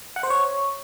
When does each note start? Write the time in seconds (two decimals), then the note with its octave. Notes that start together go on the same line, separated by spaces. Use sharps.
0.16 F#5
0.23 C5
0.30 C#5